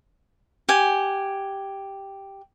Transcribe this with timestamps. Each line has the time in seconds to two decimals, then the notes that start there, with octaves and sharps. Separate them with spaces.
0.69 G4 F#5 G#5